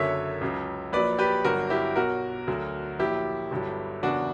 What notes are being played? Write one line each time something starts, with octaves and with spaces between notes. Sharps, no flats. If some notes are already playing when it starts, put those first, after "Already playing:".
Already playing: F#1 F#2 D3 F#3 C#5 E5
C#2 C#3 F#3
A#1 A#2 F#3 B4 D5
G4 B4
G1 G2 F#3 F#4 A#4
E4 G4
B1 B2 F#3 F#4 A#4
D2 D3 F#3
A#1 A#2 F#3 E4 G4
G1 G2 D3 F#3
F#1 E2 C#3 E3 D4 F#4